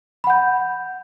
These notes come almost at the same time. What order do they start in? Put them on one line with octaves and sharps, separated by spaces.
B5 F#5 G6